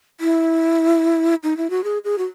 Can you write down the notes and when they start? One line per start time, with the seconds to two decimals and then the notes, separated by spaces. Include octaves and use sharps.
0.21 E4
1.43 D#4
1.57 E4
1.70 F#4
1.84 G#4
2.04 G#4
2.18 F#4